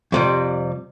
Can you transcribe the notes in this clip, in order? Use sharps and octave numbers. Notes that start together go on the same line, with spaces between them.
F2 C3 G3